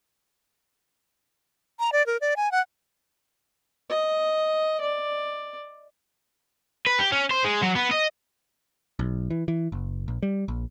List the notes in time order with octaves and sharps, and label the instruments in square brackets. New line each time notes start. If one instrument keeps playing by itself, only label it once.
[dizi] A#5
D5
A#4
D5
G#5
F#5
[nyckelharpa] D#5
D5
[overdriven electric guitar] B4
G4
C#4
C5
G#3
F#3
B3
D#5
[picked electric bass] B1
E3
E3
F#1
A#1
G3
A#1